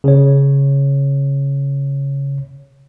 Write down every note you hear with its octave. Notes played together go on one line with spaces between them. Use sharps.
C#3 C#5